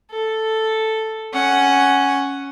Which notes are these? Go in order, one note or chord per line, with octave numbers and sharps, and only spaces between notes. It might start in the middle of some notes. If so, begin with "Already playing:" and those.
A4
C#4 F#5